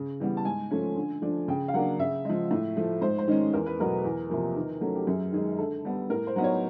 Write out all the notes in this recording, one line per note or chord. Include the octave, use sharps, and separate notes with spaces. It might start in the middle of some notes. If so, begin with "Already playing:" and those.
Already playing: C#3
E3 G3 B3
A5
G#2 G#5
F3 A3 C#4
D3
F3 A3 D4
C#3 G5
F5
F#3 A#3 D4 F#5
C#3 E5
F3 G#3
A2
F3 A3
G#2 C5
C5
D#3 G#3 C#4
E2 A#4
B4
B2 F#3 A3 A#4
E2
C3 F3 A#3
D#3
F#3 A3 C#4
G4
F#2 G#4
D#3 G#3 G#4
D3 A4
G3 B3
A2 A#4
C5
F#3 B3 D#4
C#5